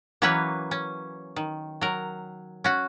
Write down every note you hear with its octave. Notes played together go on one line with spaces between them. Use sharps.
E3 F#3 A#3 C#4 B4 C#5
C#4
D#3
F#3 A#4
C#4 F#4